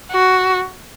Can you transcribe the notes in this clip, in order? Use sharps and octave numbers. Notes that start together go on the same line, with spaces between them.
F#4